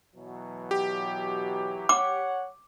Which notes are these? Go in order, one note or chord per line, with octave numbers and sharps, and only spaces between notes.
B2 E3 F#3
G4
C#5 F#5 D6